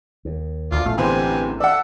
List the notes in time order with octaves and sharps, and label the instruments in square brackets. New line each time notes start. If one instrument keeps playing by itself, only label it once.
[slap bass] D#2
[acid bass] D2 [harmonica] F4 D5
[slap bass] A1 [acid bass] A3 [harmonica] F5
[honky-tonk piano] G1 E2 C5 [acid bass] C4 [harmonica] G4 B4 G#5
[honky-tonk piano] D5 F#5 [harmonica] E5 A5 E6